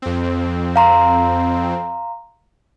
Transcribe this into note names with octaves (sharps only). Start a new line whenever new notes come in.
F2 C4
F5 A#5 C6